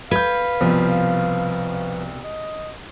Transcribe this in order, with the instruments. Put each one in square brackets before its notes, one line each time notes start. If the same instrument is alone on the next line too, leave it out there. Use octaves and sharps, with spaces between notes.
[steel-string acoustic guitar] B4 [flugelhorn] F5 [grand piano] G6 G#6
[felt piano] C2 B2 [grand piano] F3
[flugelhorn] D#5